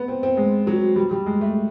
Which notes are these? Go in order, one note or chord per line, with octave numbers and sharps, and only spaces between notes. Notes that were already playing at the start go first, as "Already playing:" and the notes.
Already playing: B3
C4
C4
G#3
F#3
G3
G3
G#3
A3